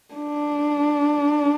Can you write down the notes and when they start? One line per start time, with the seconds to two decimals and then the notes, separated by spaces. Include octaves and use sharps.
0.14 D4